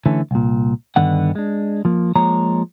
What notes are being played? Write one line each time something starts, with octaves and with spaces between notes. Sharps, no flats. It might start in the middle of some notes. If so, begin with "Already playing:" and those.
D3 E3 A3 C#4
C2 A#2
G2 D3 D#3 B3 F#5
G#3 D4
F3 A#3
F3 G#3 A#3 C#5 A#5